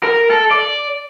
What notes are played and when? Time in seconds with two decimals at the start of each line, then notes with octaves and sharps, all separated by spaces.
0.03 A#4
0.30 A4
0.51 D5